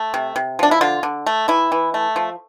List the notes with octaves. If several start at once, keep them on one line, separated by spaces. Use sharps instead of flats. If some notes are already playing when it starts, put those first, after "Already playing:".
Already playing: A3
C3
C3
F3 D4
E4
D3 F4
D3
A3
E3 E4
E3
A3
F3